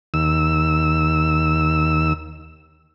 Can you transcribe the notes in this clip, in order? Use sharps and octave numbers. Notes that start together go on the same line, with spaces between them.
D#2 E6